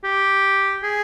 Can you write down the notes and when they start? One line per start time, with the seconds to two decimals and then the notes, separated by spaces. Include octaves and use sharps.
0.04 G4
0.83 G#4